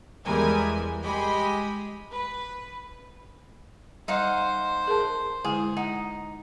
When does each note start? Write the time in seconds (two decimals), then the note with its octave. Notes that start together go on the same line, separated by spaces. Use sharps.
0.25 E2 E3 G3 G#3 A#4 G#5
1.02 G#3 G4 D#5 G#5 B5
2.11 B4
4.08 G3 D#4 C5 D#5 F5 F#5
4.87 G#4 A#4 A5
5.44 D3 G#3 E4 G#4
5.77 D#4 F#5